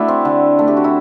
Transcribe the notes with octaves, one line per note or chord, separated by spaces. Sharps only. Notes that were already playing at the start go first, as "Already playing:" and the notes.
Already playing: A3 D4 E4 F#4
C4
D3
A3
G4
F#4
E4